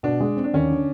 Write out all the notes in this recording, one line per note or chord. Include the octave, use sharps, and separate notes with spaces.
B2 D4
G#3
C4
D4
D#2 C#4
D3